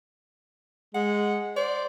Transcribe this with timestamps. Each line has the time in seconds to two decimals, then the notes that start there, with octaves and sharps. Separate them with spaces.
0.94 G#3 F#5
1.56 C5 D5